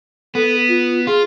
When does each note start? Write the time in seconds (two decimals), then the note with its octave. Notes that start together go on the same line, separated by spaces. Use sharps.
0.35 B3 A4
0.68 F4
1.07 F4 G#4